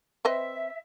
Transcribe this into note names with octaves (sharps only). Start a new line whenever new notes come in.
C4 B4 D#5 E5